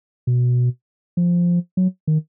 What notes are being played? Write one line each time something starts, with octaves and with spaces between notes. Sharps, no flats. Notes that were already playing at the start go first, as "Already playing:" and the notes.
B2
F3
F#3
D#3